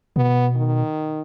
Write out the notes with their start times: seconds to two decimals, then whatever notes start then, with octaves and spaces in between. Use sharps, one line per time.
0.16 B2 B3
0.55 D#3